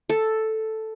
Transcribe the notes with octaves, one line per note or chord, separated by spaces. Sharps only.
A4